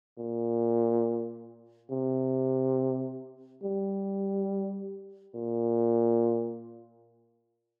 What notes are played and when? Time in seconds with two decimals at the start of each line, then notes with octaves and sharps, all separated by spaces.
0.18 A#2
1.91 C3
3.63 G3
5.34 A#2